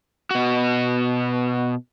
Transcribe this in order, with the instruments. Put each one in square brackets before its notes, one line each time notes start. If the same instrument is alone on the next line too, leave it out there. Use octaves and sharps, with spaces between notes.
[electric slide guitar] B2 F#4